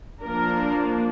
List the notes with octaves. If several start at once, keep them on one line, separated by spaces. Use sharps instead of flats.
F3 A#3 D4 A#4